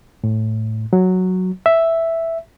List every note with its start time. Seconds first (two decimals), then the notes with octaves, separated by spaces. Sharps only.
0.24 A2
0.93 F#3
1.66 E5